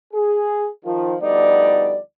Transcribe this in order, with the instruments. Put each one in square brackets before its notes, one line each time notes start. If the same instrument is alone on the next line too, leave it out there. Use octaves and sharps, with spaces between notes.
[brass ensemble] G#4
D#3 F3
D2 F3 G3 B3 D#4 D5